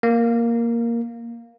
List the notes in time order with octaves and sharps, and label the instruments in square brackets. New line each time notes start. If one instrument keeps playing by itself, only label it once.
[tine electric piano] A#3